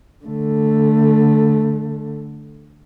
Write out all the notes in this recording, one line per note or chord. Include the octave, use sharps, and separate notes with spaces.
D3 A3